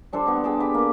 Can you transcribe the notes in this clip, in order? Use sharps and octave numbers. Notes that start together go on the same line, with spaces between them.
G3 D4 A4 C5
D3 G3 B3
G#4 G5 A5
G4 B5
A#3 G4